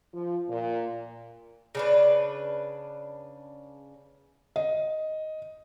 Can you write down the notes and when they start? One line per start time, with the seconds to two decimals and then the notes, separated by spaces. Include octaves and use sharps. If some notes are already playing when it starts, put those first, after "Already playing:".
0.14 F3
0.49 A#2
1.75 C#3 D4 B4
4.56 D#5